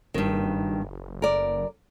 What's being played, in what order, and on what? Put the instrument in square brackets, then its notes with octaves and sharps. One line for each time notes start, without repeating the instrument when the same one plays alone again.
[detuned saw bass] F#1 [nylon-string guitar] G2 D#3
[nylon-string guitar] A#4 D5